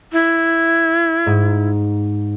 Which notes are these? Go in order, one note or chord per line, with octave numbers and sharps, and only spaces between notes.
E4
G#2